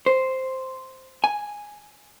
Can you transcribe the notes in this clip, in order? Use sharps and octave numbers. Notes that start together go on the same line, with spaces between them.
C5
G#5